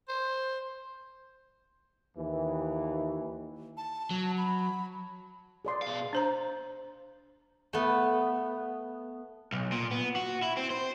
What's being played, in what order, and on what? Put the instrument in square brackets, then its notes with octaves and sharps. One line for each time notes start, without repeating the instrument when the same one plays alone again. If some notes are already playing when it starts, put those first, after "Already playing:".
[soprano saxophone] C5
[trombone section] D#2 E3
[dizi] A5
[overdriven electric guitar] F#3
[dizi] B5
[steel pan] G#4 D5 C6
[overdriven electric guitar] B2 F5
[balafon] D4 C5 A#5
[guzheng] A3 B3
[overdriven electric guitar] B1
A#2
B3
F#4
E4
C4
C5